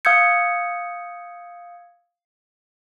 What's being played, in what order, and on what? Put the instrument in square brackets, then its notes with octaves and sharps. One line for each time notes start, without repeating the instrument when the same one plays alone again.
[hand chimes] F5 D#6 E6 G6 G#6 C#7